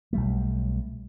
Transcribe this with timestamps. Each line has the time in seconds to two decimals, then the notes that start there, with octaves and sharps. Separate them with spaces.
0.13 B1 G3 A3